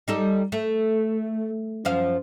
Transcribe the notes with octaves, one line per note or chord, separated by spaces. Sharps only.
G3 D#4 A4
A3
F#2 F3 F5